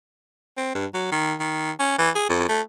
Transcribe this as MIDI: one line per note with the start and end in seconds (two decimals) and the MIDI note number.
0.57 0.73 60
0.75 0.86 43
0.94 1.11 54
1.12 1.35 51
1.40 1.72 51
1.80 1.98 61
1.99 2.10 52
2.16 2.28 68
2.30 2.45 41
2.49 2.61 57